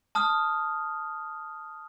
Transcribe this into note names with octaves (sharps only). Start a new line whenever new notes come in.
A5 D#6 F6